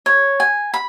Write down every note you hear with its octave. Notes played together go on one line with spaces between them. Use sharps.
C#5
G#5
B5